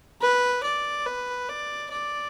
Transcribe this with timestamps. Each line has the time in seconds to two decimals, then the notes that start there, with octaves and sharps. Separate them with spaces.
0.21 B4
0.64 D5
1.06 B4
1.49 D5
1.91 D5